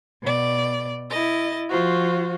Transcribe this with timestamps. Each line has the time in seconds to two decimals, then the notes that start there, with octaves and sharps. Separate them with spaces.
0.23 B2 D5
1.11 E4 D#5 A6
1.70 F3 F4 F#4 C5